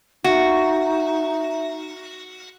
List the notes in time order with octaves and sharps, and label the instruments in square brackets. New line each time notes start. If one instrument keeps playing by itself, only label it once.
[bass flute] D#4 [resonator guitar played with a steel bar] F#4 [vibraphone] E5